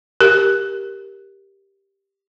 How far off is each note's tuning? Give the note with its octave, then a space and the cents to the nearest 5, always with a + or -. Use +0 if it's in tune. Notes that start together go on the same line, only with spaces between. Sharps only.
G4 +0 A#4 +0